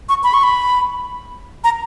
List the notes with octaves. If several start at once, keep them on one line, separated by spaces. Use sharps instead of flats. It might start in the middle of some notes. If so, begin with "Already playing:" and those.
C#6
B5
C#6
B5
A#5